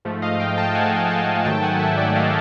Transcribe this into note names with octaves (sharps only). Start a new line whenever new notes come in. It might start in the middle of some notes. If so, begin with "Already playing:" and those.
G#2 F3 A3
D#5 F5
F5 G5
G5 A5
F#5 G#5
G5 A5
G#2 D#3 F#3 A3 G5 A5
F#5 G#5
E5 F#5
D5 E5
D#5 F5